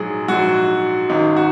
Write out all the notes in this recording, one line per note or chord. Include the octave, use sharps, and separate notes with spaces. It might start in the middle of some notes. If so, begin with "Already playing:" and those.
Already playing: A#1 G#2 F#3 G#4
A#1 G#2 F#3 F#4
G#1 F#2 D#3 D#4
F#4